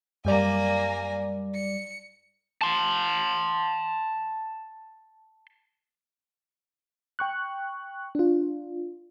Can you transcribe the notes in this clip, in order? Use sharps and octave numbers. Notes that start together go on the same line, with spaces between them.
F#2 G3 A#3 D5 G#5
C#7
A5 C6
G5 C#6 F#6
D4 F4